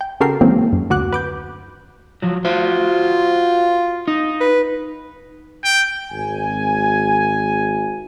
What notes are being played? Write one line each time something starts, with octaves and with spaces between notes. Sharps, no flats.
G5
C#3 F#4 G4 A4 A#4 C7
D#3 E3 F#3 G#3 A#3 C4
F#2
D2 F#4 D6 F#6
B4 D6 G6
F3 F#3
F4 F#4 C5
D#4
B4
G5
G#1 G#5